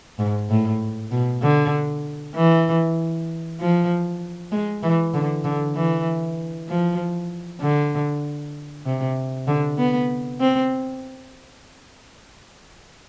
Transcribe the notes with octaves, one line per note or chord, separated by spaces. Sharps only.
G#2
A2
B2
D3
E3
F3
G#3
E3
D3
D3
E3
F3
D3
C3
D3
B3
C4